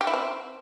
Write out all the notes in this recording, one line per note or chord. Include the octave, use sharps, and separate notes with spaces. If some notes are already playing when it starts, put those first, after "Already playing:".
G4
E4
C4